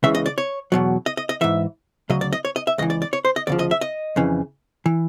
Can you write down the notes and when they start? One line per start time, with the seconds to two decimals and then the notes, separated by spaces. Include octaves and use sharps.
0.03 C#2 C#3 E3 E5
0.15 D#5
0.26 D5
0.38 C#5
0.72 E2 B2 F#3
1.06 D#5
1.17 D#5
1.29 D#5
1.41 G#2 E3 E5
2.10 D2 C#3 F#3 D#5
2.21 D5
2.33 D#5
2.45 C#5
2.56 D#5
2.67 E5
2.78 C#2 C#3 E3 D#5
2.90 D5
3.02 D5
3.13 C#5
3.25 C5
3.36 D#5
3.47 D2 C#3 F3 D5
3.59 D#5
3.71 E5
3.81 D#5
4.16 F2 C#3 E3
4.86 E3